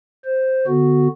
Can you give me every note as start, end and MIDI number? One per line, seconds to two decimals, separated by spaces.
0.25 0.66 72
0.67 1.08 50
0.67 1.08 59
0.67 1.08 66